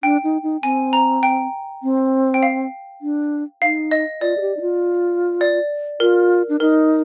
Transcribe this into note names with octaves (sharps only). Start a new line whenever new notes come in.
D4 G5
D#4
D#4
C4 G#5
A#5
G5
C4
G5
F5
D4
D#4 F5
D#5
F4 D5
G#4
G4
D#4
F4
D5
F4 A#4
D4
D#4 A#4